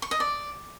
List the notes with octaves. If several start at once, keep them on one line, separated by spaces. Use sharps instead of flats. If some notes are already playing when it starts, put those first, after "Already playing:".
C#6
D#5
D5